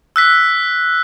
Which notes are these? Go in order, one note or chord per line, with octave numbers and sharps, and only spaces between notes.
E6 F#6 B6